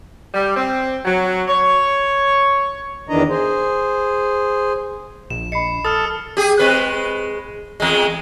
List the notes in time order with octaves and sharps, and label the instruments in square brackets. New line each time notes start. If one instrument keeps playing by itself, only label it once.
[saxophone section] G3
C4
F#3
C#5
[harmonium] E2 D#3 E3 D4 D#5 A#5
G#4 C5
[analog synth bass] A#1 [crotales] E7
[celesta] D#5 B5 [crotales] C7 C#7
[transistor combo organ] A4 [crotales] D#6 F6 E7
[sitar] G4 G#4
G#3 C4 B4
E2 G#3